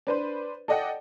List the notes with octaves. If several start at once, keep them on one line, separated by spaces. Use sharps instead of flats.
D4 B4 C5
A4 D5 D#5 F#5 G5